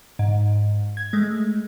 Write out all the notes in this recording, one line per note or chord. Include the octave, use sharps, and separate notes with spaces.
G#2
G#6
G#3 A3